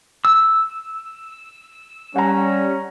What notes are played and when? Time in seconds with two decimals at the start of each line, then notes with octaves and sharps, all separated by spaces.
0.25 E6
2.16 G3 C#4 F#5 A#5